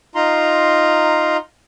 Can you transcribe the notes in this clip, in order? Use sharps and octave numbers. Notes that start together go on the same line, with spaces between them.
D#4 F4 A#5 C6